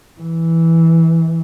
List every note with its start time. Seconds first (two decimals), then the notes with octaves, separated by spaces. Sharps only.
0.21 E3